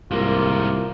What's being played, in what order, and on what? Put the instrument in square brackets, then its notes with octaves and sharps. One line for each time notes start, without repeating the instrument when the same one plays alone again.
[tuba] C2 [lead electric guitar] G#2 A#3 [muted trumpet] F4